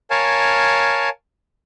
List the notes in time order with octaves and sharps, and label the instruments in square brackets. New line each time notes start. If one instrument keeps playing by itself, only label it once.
[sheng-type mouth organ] A#4 C#5 F5 G#5 A5